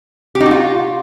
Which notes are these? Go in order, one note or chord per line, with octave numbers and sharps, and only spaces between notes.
G4
D#4
F#4
F4